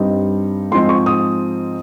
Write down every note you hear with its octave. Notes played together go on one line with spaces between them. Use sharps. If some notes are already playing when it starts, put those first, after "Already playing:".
Already playing: G2 G3 C4 D#4
G#2 F3 G#3 C4 C6
C#6
D#6